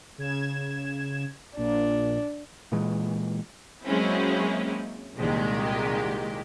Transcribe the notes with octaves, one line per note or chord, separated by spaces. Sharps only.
C#3 G#6 E7
A#1 A#2 D4
A#2 E3 G#3
F#3 G#3 A#3 C4 C#4 E4
C2 A#2 D#3 G#3 G4